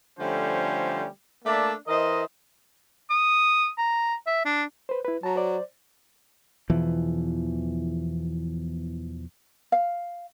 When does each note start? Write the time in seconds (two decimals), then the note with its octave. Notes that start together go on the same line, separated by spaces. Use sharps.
0.19 D3 F3 G3 A3 C#4 C5
1.45 A3 A#3 D4 D5 E5 A5
1.86 E3 A#4 C5 D#5
3.10 D#6
3.78 A#5
4.27 E5
4.45 D4
4.89 B4 C5
5.05 E4 B4
5.23 F#3 A5 A#5
5.36 C5 D5
6.70 E2 B2 E3 F3
9.72 F5